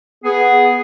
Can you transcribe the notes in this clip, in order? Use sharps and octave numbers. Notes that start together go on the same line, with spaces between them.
B3 G#4